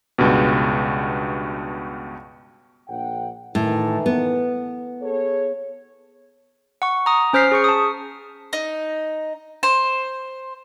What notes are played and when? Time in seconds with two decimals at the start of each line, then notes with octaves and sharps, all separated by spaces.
0.18 C#2 G2 B2
2.88 A#1 F#5 G5
3.55 A2 D#3 E3
4.06 B3
5.02 G#4 A4 C#5
6.82 F#5 C#6
7.06 A#5 D#6
7.33 C#4 C5 F6 B6 C7
7.52 G#4 C#6 C#7
7.64 A5 D#6
8.53 D#4
9.63 C5